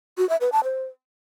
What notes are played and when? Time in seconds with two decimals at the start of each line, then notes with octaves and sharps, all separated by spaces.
0.18 F#4
0.29 E5
0.41 B4
0.52 A5
0.64 C5